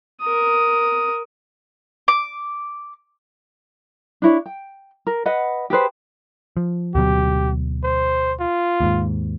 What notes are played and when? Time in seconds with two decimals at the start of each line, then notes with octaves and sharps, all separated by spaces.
0.21 A#4 D#6
2.08 D6
4.22 D4 E4 C#5
4.46 G5
5.07 A#4
5.26 B4 D#5 F#5
5.70 G4 G#4 B4 C5
6.57 F3
6.95 D2 B2 F#3 G4
7.84 C5
8.40 F4
8.80 D#2 G#2